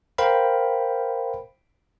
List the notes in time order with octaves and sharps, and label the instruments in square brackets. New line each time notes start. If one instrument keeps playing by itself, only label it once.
[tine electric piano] A#4 C5 F5 G5 B5